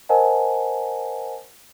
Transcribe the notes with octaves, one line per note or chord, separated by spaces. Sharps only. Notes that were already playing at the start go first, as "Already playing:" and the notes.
A#4 C5 D#5 F#5 G#5 A5